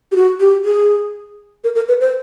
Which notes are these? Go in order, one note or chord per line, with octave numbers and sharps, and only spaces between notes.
G4
F#4
G4
G#4
A#4
A#4
B4
C5